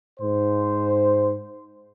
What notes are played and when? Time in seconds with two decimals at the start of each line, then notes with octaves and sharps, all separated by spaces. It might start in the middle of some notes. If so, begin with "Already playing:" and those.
0.20 G#2 C5